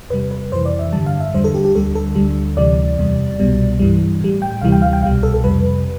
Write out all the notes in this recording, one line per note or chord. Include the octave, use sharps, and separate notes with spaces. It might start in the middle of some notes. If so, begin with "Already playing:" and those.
E2 C3 G3 B4
B4
F2 C3 E3 C5
D5
E5
G2 D3 G3 A5
F5
E5
E2 D3 G3 C5
A4
G4
G4
D2 D3 G3 A4
A4
D2 D3 G3
D2 C3 E3 G3 D5
E2 C3 G3
C2 B2 G3
G2 E3 G3
A2 G3
G5
D2 C3 E3 G3 F5
G5
F5
G5
C2 B2 G3 F5
A4
A4
F2 C3 G3 B4